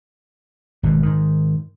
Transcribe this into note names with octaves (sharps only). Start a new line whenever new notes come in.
G#1 B2 D#3
G#2 D#3